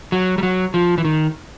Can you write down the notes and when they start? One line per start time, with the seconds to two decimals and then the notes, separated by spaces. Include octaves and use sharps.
0.12 F#3
0.38 G3
0.43 F#3
0.74 F3
0.98 E3
1.05 D#3